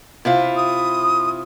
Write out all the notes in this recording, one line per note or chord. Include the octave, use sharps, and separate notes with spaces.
C3 E4 F4
D#6